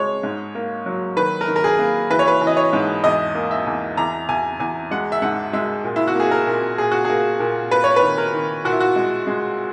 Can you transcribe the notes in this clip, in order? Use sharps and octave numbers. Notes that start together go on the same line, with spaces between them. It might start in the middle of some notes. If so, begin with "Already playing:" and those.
Already playing: G#3 C#5
G#2
A#3
F#3
D#3 B4
A#4
D#3
A#4
G#4
A#3
E3 B4
C#5
B4
E3
D#5
C#5
G#2
E2 D#5
A#3
E5
E2
E2 A#5
E2 G#5
E2 G#5
G#3 F#5
E5
G#2 F#5
G#3 E5
A#2
E4
F#4
A#3 G#4
A#4
A#2
A#2 G#4
F#4
A#3 G#4
A#2
A#3 B4
C#5
B4
D#3
A#4
D#3
A#2 F#4
E4
F#4
G#3
G#3